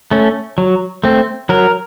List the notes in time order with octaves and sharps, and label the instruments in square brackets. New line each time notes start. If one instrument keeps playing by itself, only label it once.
[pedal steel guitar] A3 C#4
F#3
A3 C4
F#3 A#4